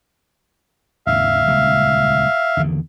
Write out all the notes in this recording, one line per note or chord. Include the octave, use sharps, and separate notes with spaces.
G#1 D#2 C#3 E5 F5
D#1 C#2 C#3
E2 D3 D#3